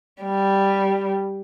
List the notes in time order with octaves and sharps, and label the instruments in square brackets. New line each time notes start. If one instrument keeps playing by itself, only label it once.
[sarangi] G3